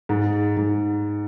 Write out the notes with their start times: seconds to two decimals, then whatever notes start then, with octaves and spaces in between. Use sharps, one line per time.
0.09 G#2
0.57 G#2